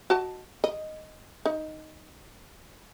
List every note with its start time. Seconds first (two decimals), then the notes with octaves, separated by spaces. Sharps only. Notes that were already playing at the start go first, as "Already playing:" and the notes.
0.10 F#4 D#5 A5
0.64 D#5
1.46 D#4